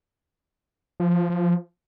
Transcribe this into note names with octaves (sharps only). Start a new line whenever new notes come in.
F3
F3
F3
F3